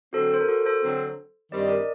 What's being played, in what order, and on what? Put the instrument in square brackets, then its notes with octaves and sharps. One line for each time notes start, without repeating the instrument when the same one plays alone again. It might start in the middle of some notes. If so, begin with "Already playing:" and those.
[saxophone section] D3 F#3 C4 [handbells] F#4 A4
[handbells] C5
A#4
F#4 A4
A4 C5
[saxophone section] D3 F#3 C4
[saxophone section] G2 D#3 G3 C4 [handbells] D5
[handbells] D#5
A#4 D5